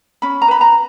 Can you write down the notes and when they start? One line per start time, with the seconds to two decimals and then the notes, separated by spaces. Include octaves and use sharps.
0.22 C#4 B5
0.42 A#5
0.48 B4 B5
0.61 A#5